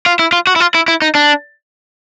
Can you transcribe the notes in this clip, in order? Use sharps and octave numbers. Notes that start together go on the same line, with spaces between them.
F4
E4
F4
F#4
E4
F4
E4
E4
D#4
D4